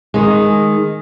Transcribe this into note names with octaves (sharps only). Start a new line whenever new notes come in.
D#3 G#3